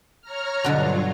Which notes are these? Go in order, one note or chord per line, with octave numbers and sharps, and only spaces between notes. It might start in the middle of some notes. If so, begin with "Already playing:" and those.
C#5 A#5 F6
G2 B2 D3 F#3 F4